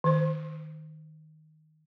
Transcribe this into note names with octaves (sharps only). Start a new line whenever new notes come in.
D#3 C5